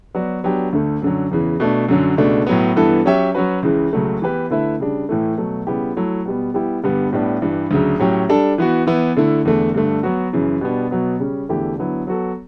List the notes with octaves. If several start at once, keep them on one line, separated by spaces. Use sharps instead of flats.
F#3 B3 F#4 B4 D5
F#3 B3 D4 G4
D2 D3 A3
F#2 D3 F#3
E2 C#3 E3
B2 A3 D4
F#2 D3 F#3
C#2 B2 A3 D4
A2 F#3 B3
G2 E3 B3 E4 A4
F#3 C#4 G4 C#5 E5
F#3 C#4 F#4 B4
C#2 C#3 E3
C#2 C#3 F#3 A3
E3 B3 E4 G4 B4
D3 A3 E4 B4 E5
C#3 G3 D4
A2 E3 A3
B2 F#3 A3
C#3 G3 B3 E4 G4
F#3 A3 E4
B2 G3 B3
G3 B3 E4 G4
G2 D3 G3 B3
A2 G3 B3 D4
G2 E3 G3
D2 C#3 F#3
A2 F#3 C#4 G4
G3 D4 A4
E3 B3 F#4
E3 B3 E4
D3 A3 E4
E2 D3 A3
G2 D3 A3
F#3 B3 F#4
F#2 C#3 E3
B2 G3 B3 D4
B2 F#3 B3
C#3 G3 C#4
E2 D3 A3 E4 G4
D3 F#3 B3 E4
F#3 B3 F#4 A4